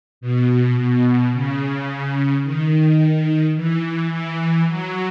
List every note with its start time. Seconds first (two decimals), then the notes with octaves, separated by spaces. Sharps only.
0.21 B2
0.77 B2
1.32 C#3
2.43 D#3
3.56 E3
4.11 E3
4.67 F#3